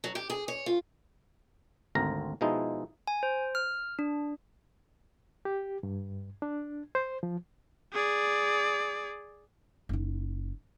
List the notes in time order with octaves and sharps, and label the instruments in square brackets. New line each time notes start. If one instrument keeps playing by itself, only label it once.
[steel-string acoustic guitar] F#3
G4
G#4
C#5
F4
[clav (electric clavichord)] G#1 D2 C4 A#4 A#5
B2 F3 G#3 D#4 E4
[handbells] G#5
C5
F6
D4
[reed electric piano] G4
G2
D4
C5
F3
[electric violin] G#4 D5
[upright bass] F#1 D#4